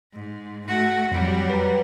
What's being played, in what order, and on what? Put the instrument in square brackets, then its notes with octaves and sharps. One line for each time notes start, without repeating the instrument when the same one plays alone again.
[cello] G#2
A3 F#4
[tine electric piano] F2 [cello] F#3 G3
[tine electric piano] B4 A#5